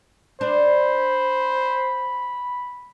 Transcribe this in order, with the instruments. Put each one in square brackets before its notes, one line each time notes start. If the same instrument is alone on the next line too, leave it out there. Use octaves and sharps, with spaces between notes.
[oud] D4 [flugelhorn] C5 [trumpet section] B5